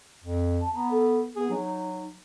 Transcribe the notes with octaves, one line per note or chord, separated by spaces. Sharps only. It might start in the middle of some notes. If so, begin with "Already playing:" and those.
F2
A5
B3 A#5
A4
B3 G#4
F#3 D#4